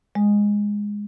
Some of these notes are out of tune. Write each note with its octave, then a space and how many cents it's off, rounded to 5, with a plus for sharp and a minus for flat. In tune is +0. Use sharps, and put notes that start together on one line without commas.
G#3 -10